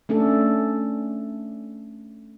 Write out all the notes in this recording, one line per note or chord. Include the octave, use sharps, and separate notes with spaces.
A3 C#4 D4 A4